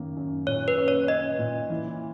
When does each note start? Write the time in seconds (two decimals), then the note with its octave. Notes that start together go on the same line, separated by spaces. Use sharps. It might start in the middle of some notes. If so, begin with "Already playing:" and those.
Already playing: F#2 D#3 A#3
0.17 F#2
0.47 A#2 C#5
0.68 B4
0.78 C#4
0.88 C#5
1.08 C#4 D#5
1.39 A#2
1.70 E3